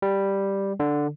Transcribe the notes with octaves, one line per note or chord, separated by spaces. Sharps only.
G3
D3